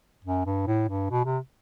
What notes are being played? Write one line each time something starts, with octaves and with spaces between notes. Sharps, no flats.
F#2
G2
A2
G2
B2
C3